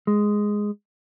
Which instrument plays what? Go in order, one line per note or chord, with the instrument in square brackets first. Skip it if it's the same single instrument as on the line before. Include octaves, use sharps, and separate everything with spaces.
[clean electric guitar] G#3